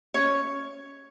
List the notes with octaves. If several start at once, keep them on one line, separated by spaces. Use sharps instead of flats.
C#4 C#5